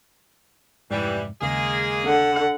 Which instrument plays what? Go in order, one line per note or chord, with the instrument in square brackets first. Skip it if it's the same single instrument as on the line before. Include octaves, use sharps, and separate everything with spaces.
[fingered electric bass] F1 G#2 [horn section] E3 G3
[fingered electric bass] D#2 C#3 [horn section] G#3 A#3 G#4
[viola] D3 F#5